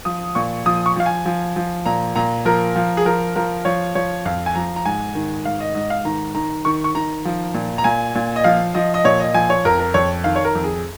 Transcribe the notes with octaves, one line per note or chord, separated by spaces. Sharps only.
F3 D#6
A#2 C#6
F3 D#6
C#6
F3 F5
G#5
F3
F3
A#2 A#5
A#2 A#5
F3 A#4
F3
G#4
F3 A#4
F3 A#4
F3 C#5
F3 C#5
F2 F5
G#5
F3 A#5
A#5
G#2 G#5
D#3
G#2 F5
D#5
G#2 D#5
F5
D#3 A#5
D#3 A#5
D#3 C#6
C#6
D#3 A#5
F3
A#2
A#5
A#2 G#5
A#2
D#5
F3 F5
F3 D#5
D#5
A#2 C#5
D#5
F3 G#5
C#5
F2 A#4
A#4
F2 C#5
D#3 F5
C#5
A#4
F2
G#4